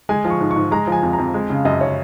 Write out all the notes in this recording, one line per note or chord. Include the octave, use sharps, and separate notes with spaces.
G#3 G#5
F3
C#6
G#2
C#6
G#2
G#3 A#5
F3 G#5
F2
F2 A#5
G#3
C#3 F5
F#2 D#5
C#5